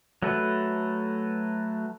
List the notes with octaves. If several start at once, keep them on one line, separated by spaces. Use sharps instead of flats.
F#3 A3 F#4 A4 B4